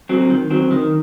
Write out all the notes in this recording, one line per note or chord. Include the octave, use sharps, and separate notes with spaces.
F#3 C4
D#3
F#3 C4
D#3